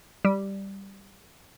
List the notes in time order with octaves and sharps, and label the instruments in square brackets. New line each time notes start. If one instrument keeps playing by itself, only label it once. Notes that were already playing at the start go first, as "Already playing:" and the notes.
[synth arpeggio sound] G3